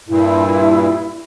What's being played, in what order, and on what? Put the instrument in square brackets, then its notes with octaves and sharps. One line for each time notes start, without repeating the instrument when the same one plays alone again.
[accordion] G2 A#2 [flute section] E4